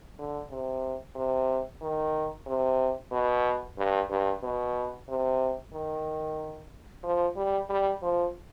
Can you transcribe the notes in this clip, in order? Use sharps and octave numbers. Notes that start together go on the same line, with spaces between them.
D3
C3
C3
D#3
C3
B2
G2
G2
B2
C3
D#3
F3
G3
G3
F3